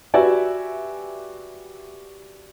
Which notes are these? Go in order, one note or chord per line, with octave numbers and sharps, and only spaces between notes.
F#4 G4 B4 D5 E5 G#5